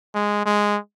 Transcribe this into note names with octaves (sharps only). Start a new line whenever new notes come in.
G#3
G#3